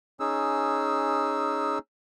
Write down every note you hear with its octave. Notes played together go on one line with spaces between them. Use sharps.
C#4 D#4 G#4 E6